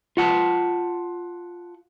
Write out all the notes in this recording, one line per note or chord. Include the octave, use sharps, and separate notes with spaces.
F4 F#5 A5